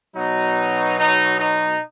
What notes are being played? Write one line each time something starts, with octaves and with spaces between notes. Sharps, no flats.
B2 F#3 D#4
D#4
D#4